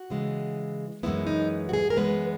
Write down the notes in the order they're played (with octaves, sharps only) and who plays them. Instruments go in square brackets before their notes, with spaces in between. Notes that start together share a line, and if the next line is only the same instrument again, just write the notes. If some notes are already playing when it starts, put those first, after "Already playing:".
Already playing: [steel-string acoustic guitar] F#4
C#3 E3 G#3
F#2 E3 G#3 B3 E4
D#4
F#4
G#4
A#4
F#2 E3 G#3 B3 B4